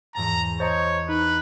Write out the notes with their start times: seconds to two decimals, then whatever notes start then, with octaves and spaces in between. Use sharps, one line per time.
0.15 E2 G#2 A5 A#5
0.60 C5 C#5 D#5 A5 A#5 C#6 G#6
1.09 D#4 B4